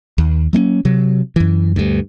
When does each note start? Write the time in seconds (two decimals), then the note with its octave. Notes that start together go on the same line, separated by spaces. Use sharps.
0.18 D#2
0.53 F#3 A#3 B3 C#4
0.85 C3 F#3
1.36 F#2 E3
1.76 D2 G2